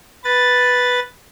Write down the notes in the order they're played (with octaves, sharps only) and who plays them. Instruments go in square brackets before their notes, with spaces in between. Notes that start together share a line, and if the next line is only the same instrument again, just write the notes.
[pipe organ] B4 A6